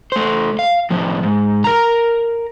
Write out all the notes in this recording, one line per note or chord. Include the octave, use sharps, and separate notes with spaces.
A3 C5
F5
A2 F3
G#2
A#4 A#5